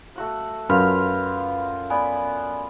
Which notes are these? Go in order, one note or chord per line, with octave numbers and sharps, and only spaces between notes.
A3 F#4 F#5
F#2 F4 B4 B5 F6
B3 B4 D5 G#5